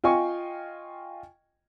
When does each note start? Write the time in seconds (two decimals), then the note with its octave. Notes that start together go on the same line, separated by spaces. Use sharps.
0.04 F4 D#5 G5 G#5 C#6